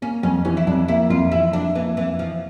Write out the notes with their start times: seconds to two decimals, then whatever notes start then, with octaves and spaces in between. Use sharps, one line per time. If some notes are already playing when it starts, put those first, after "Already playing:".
0.02 A#3 C#4
0.23 F2 C#4
0.45 E3 C#4
0.57 E4
0.67 F2 D4
0.88 A#3 E4
1.10 F2 F4
1.32 E3 E4
1.53 F2 D4
1.75 E3 A#3
1.97 F2 E3
2.19 E3 F3